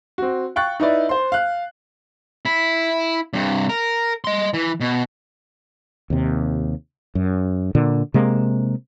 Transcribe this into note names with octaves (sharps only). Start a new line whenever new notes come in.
C4 F#4
F5 G5 C#6 F#6 A6
D#4 E4 B4 D5
C5 C6
F5 F#6
E4
G2 C3
A#4
D#5 C6
E3
B2
D#2 C3
F#2
A#2 D3
C3 G#3 A#3